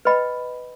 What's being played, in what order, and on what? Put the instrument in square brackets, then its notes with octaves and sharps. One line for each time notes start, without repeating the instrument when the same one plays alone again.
[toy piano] B4 D#5 G5 B5